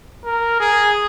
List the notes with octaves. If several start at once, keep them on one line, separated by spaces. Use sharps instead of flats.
A#4
G#4